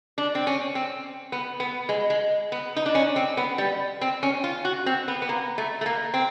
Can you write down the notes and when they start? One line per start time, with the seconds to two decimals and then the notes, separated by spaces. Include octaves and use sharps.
0.18 D4
0.35 C4
0.47 C#4
0.75 C4
1.32 B3
1.60 B3
1.89 G#3
2.10 G#3
2.52 B3
2.76 D#4
2.86 D4
2.95 C#4
3.16 C4
3.37 B3
3.58 G3
4.01 C4
4.23 C#4
4.44 F4
4.65 F#4
4.86 C4
5.08 B3
5.22 B3
5.29 A#3
5.58 A3
5.81 A3
5.86 A#3
6.14 C4